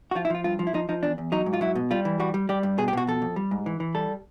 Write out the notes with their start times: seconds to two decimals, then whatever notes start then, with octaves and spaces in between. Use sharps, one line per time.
0.11 F#4
0.15 F3 F4
0.25 E4
0.30 F3 F4
0.44 G2 F4
0.59 F3
0.67 E4
0.74 F3 D#4
0.89 F3 D#4
1.03 E2 D4
1.18 E2
1.32 F#3 D#4
1.46 G#2
1.53 F4
1.61 F#3 E4
1.75 B2
1.91 G3 F4
2.05 E3
2.20 G3 F#4
2.34 G3
2.49 G3 G4
2.63 G2
2.78 B2 G#4
2.88 G4
2.93 B2 F#4
3.07 F2 A4
3.22 F2
3.36 G3
3.51 G#2
3.66 E3
3.80 E3
3.95 G3 A4